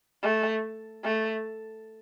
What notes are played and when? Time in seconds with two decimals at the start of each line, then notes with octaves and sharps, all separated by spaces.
0.23 A3
1.04 A3